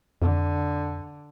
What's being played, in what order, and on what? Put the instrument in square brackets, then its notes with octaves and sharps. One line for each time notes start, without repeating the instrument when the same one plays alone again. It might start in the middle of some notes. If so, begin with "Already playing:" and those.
[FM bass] F2 [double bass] D3